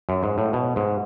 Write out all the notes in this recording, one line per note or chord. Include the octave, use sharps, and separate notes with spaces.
F#2
G#2
A2
B2
G#2